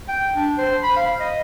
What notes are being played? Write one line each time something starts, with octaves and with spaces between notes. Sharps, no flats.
G5
D4
C5
B5
F5
D#5